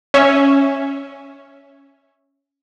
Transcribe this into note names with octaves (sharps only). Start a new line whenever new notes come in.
C#4 E5